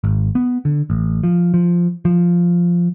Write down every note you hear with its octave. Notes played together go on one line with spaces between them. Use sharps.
G#1
B3
D3
A1
F3
F3
F3